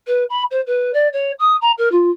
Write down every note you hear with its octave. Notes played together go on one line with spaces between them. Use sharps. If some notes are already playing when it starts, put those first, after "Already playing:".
B4
B5
C5
B4
D5
C#5
D#6
A#5
A#4
F4